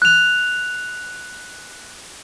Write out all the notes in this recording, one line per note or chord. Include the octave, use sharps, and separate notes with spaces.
F#6 F7